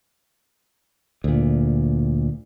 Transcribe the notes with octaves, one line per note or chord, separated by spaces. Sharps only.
D2 A#2